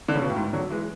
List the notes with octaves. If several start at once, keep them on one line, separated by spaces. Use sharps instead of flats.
D3
C#3
B2
A2
G#2
D3 F#3
E3 G#3